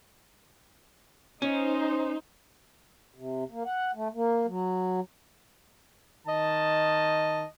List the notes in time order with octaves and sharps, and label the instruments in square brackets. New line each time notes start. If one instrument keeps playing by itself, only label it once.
[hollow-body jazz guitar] C#4 [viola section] D#4 C5
[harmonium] C3
A#3
F#5
A3
A#3
F#3
[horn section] D#3 D#5 A5